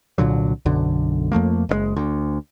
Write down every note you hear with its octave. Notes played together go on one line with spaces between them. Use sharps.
C2 A#2 D3 F#3
B1 F#2 D3
F2 F3 A3 A#3
F#1 C3 G#3
D2